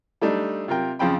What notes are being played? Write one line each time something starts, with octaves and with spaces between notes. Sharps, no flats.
G3 A3 D4 D#4
C3 F4 A#4 G5
F2 C#3 F3 C4 G5 B5